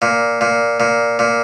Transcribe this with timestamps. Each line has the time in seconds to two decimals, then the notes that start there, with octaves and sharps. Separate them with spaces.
0.02 A#2
0.41 A#2
0.80 A#2
1.19 A#2